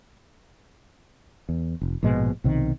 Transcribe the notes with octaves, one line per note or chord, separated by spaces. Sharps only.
E2
F1
A#1 G#2 B2 G#3
B1 C3 D#3